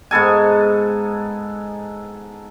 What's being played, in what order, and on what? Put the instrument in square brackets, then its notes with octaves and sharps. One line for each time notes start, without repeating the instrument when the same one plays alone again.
[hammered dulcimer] G#2 B3 A4 G#5